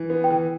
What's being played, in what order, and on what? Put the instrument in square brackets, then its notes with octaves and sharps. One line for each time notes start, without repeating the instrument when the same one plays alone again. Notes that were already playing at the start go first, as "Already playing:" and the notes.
Already playing: [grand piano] E3
B3
[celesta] G5
[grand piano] E3